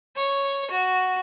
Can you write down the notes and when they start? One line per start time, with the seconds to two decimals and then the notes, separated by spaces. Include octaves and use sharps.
0.16 C#5
0.71 F#4